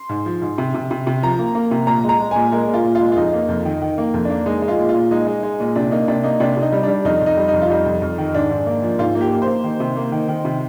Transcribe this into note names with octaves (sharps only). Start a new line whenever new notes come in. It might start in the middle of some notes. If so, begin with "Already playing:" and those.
Already playing: C6
G#2
F3
G#2
C3
C3
C3
C3
F3 A#5
A#3
A#3
C3
A#2 A#5
G#3
A#5
G#3
A#2 G#5
G#3 A#4
A#2
F4
A#2
F4
G#3
F4
F2 D#4
A#3
F2
D#3
D#3
A#3
F2
A#3 D4
G#3 D#4
G#3
F4
A#2
F4
A#2
G#3 D#4
G#3
G#3
A#2
C3 D4
A#3 D#4
C3 D4
A#3 D#4
C3 D4
C3
D#4
G3
G3 D4
F2 D#4
F2 D#4
G3
D#4
F2
F4
G3 D#4
F2
F2
D#3
G#2 D4
G#2
A#3
F3
G#2 F4
A#3
G4
A#3
C5
A#3
D#3
C3
A#3
D#3
D#3
C3